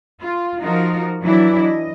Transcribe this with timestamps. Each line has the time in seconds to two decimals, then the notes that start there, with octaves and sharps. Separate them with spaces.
0.22 F4
0.60 F3 D#4 F4 F#4 A#4
1.22 E3 F#3 D4 E4
1.59 D#5